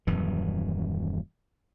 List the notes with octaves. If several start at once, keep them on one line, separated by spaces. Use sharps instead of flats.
D#1 F#2 E3